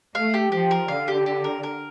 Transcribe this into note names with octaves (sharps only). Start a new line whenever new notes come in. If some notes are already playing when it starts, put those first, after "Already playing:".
A3 F5
G4
F3 G4
A#4
D3 F5
G4
G4
A#4
A#4